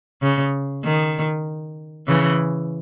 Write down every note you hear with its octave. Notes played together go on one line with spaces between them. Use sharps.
C#3
D#3
C#3 E3